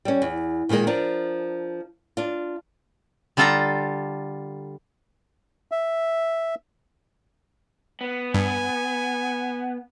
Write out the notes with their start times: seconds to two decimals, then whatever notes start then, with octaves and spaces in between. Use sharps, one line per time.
0.05 G3 C#4
0.22 E2
0.69 A#2 D#3 F3 G#3 A#3
0.87 F3 D4 A#4
2.17 D4 F4
3.37 D3 G3 F4 A4 A5 A#5
5.71 E5
8.01 B3
8.34 G2 G#5